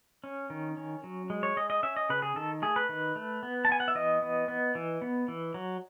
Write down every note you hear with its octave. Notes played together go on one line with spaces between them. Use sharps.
C#4
D#3
C#4
F#3
G#3
C#5
G#3 D#5
D#5
C#4 E5
D#5
C#3 B4
G#4
D#3 A4
A3 G#4
B4
D#3
A3
B3
A5
B3 G#5
F#5
E5
E3 D#5
B3
B3
E3
B3
E3
F#3